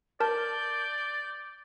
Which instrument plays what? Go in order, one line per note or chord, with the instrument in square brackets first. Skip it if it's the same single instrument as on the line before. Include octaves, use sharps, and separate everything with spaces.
[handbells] A#4 A5 [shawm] D5 [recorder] G6